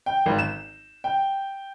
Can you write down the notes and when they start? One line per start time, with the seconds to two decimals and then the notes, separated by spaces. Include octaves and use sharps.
0.06 G5
0.26 G#1
0.39 E7
1.04 G5